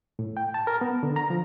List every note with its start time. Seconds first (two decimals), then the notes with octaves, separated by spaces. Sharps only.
0.19 A2
0.37 G5
0.54 A5
0.67 A#4
0.81 B3
1.03 D3
1.16 A#5
1.30 F3